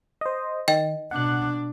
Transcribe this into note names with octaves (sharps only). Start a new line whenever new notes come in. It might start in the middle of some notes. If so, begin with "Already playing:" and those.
C5 D#5
D#3 D#5 G5
B2 D4 F#5 F#6